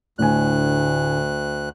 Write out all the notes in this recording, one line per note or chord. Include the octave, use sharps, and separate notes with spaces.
D2 A2 D3 G#5 F#6